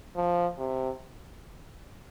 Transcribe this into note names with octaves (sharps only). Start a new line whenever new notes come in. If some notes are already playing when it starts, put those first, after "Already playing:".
F3
C3